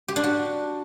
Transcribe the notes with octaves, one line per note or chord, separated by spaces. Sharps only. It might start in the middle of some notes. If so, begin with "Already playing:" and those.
G4
D4
F#4